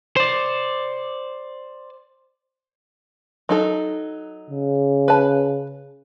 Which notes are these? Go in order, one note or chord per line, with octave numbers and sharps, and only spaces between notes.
C5 D5
F#3 D#4 A4
C#3
B4 A5